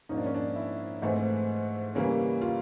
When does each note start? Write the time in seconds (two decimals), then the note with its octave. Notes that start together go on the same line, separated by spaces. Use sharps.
0.09 G#2 F3 A#3 C#4 D#4
0.17 D4
0.26 C#4
0.34 D4
0.56 E4
1.02 G#2 E3 A3 C4
1.95 C#3 E3 G3 A#3 C#4
2.41 F4